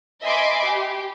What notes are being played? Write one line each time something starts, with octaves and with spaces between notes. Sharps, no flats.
D#5 E5 G#5 B5 C6 D6
G4